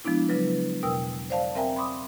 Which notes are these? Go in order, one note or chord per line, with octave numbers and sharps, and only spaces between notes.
F3 G#3 B3 D4 E4
C#3 F#3 B4
E2 B2 A#4 G5 E6
C5 D5 F5 A5
C4 A#4 E5 G5 G#5 A#5
B5 C6 D6 D#6